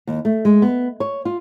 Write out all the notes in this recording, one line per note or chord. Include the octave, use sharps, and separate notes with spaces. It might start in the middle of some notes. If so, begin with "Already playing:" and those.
D#2
A3
G#3
B3
C#5
F4